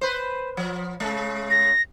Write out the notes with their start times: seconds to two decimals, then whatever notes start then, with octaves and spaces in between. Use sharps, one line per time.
0.01 B4 C5
0.57 F3
1.00 C#3 G#3
1.50 A#6